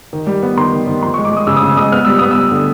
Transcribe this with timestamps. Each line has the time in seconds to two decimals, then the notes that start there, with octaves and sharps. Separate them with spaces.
0.13 D#3
0.27 G3
0.43 B3
0.57 D#3 C6
0.73 D#3
0.87 D#3
1.02 F3 C6
1.14 C#6
1.18 G#3
1.25 D6
1.32 G#3 D#6
1.47 C#3 E6
1.57 D#6
1.63 C#3 E6
1.77 G#3 D#6
1.92 B3 F6
2.05 G3 E6
2.19 B3 D#6
2.31 E6
2.38 G3
2.52 D3